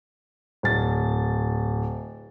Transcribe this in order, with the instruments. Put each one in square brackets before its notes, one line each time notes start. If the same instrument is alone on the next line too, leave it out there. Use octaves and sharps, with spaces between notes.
[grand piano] D1 A6